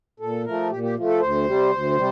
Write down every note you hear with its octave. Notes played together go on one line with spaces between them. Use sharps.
A#2 A4
F3 A3 A#4
A#2 G4
G4
F3 A3
A4
D2 C5
C3 G3
D2
C3 G3